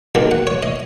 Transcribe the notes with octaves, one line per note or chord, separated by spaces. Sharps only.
D#2 D#3 F#3
F#5
C#5
D#5